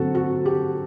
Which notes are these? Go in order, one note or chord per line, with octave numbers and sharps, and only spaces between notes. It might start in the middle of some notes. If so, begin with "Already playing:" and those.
Already playing: D3 F#3 C4 F#4 A4
F#4
G4